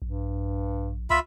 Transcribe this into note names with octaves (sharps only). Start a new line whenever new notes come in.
A#1 G2
C#2 F4 E5 B5